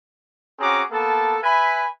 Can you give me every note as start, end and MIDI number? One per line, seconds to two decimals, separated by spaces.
0.60 0.82 60
0.60 0.82 61
0.60 0.82 66
0.60 0.82 68
0.60 0.82 82
0.60 0.82 86
0.91 1.38 58
0.91 1.38 59
0.91 1.38 69
0.91 1.38 81
1.43 1.86 71
1.43 1.86 76
1.43 1.86 80
1.43 1.86 83